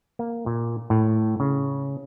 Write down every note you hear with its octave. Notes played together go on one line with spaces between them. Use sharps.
A#3
A#2
A2
C#3